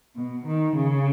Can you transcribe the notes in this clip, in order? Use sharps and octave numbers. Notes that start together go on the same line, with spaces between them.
B2
D#3
C#3